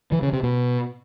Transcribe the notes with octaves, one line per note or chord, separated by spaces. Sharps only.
E3
C#3
C3
B2